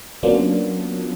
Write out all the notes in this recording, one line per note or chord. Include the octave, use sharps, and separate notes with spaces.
F#3 A#3 B3 C#4 D4 F4